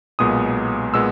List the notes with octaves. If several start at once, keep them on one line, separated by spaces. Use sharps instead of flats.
B1 A#2 G#3 B3 D#6
A#2 G#3 B3 E6